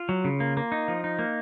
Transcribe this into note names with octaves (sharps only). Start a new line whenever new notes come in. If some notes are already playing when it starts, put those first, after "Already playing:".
Already playing: F4
F#3
C#3
A#3
A#3
D#4
F3
D#4
A#3